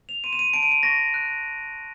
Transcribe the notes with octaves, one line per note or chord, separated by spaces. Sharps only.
F7
C6 D#7
E7
D#7
A5 D7
D#7
D7
C#6 A#6
F#6